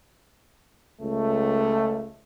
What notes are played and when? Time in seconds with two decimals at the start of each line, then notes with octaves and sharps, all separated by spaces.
1.02 C#2 A3